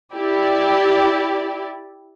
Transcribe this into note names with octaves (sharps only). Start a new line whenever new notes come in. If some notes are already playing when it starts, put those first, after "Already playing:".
E4 G4 D5